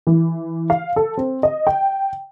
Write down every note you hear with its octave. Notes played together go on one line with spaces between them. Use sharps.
E3
F5
A4
C4
D#5
G5